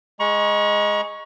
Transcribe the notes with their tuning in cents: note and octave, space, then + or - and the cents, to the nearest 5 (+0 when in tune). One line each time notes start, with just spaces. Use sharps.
G#3 +0 A#5 +40 C#6 +0